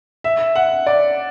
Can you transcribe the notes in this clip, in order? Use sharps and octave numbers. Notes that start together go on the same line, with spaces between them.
E5
F#5
D5